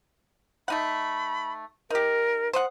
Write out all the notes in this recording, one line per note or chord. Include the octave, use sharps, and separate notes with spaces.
A3 D#4 F#5 B5
D#4 G4 A#4
C5 D#5 F#5